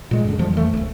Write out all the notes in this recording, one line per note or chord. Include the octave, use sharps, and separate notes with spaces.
A#2 G#3
F#2 D3
F2 F3 G3
E3 A3
D1 A#1